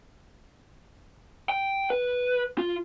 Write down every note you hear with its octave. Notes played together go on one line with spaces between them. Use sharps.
G5
B4
F4